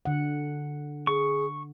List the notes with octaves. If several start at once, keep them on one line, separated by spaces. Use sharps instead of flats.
D3 F#5
G#4 C#6